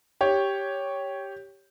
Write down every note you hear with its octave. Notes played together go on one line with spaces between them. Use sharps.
G4 C#5